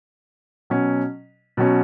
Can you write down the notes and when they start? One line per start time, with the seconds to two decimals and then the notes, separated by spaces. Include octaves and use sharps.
0.70 B2 F#3 C#4
1.57 B2 F#3 C#4